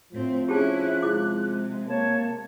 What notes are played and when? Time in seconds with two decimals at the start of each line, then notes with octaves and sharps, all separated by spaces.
0.13 A2 F3 C4
0.49 C#4 E4 G4 G#4 A5 F#6
1.02 C3 G#3 E4 G#4 D6
1.87 A#3 C#5 A5